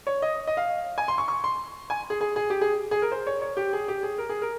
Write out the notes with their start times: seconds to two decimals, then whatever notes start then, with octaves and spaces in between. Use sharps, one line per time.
0.07 C#5
0.22 D#5
0.47 D#5
0.57 F5
0.98 G#5
1.08 C6
1.18 C#6
1.28 C#6
1.44 C6
1.90 G#5
2.10 G#4
2.21 G#4
2.36 G#4
2.50 G4
2.61 G#4
2.91 G#4
3.02 A#4
3.12 C5
3.27 C#5
3.42 C#5
3.57 G4
3.73 G#4
3.88 G4
4.03 G#4
4.18 A#4
4.29 G#4
4.42 A#4